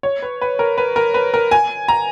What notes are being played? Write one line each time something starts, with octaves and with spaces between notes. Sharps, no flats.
C#5
B4
B4
A#4
B4
A#4
B4
A#4
G#5
A#5